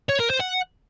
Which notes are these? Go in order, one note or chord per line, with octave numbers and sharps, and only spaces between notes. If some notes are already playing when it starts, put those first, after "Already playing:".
C#5
A#4
C5
F#5